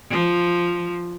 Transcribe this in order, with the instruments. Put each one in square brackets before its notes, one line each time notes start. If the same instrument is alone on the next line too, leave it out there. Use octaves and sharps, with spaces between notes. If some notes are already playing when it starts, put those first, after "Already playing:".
[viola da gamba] F3